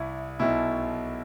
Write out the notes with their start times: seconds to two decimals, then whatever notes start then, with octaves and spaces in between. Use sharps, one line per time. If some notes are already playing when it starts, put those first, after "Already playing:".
Already playing: C2 E4
0.39 B1 B2 E4